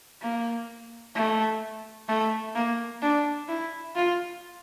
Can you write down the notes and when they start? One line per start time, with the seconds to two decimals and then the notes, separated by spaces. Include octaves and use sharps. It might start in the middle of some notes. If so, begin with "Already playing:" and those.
0.22 A#3
1.15 A3
2.08 A3
2.55 A#3
3.02 D4
3.48 E4
3.95 F4